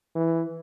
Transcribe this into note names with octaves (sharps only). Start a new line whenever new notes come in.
E3